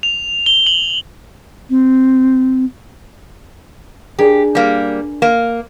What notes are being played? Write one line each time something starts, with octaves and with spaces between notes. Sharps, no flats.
F7
G7
F#7
C4
D4 G4 G#4 A#4
G3 A#3
A#3